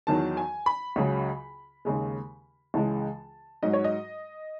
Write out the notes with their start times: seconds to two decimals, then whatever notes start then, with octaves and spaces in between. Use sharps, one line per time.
0.07 E2 D#3 F#3 A5
0.37 G#5
0.66 B5
0.96 C#2 C#3 F#3
1.85 D#2 C#3 G#3
2.74 C#2 C#3 E3 G#3 A5
3.63 G#2 F#3 D#5
3.73 C#5
3.84 D#5